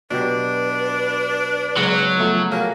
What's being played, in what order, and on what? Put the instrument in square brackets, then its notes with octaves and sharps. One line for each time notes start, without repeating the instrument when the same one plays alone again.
[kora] B2 F#3 G4 [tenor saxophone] D4 [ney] B4
[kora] G#2 C#3 B3 [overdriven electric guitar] F#3
[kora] F3 A3 B3
[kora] F#3 G#4 A#4 [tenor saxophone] A#3